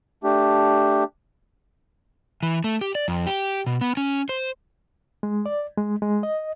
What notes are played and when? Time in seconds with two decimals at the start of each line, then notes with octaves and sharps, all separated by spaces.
0.24 A3 D4 G4
2.43 E3
2.64 A3
2.81 G4
2.95 D5
3.08 F2
3.27 G4
3.67 B2
3.81 B3
3.97 C#4
4.29 C5
5.23 G#3
5.46 D5
5.78 G#3
6.02 G#3
6.23 D#5